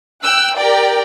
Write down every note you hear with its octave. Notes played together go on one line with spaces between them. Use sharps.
G5 E6 F#6
G4 A#4 D5 G5